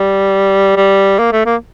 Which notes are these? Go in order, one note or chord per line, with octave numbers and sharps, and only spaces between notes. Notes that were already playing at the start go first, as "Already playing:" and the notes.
Already playing: G3
G3
A#3
A3
A#3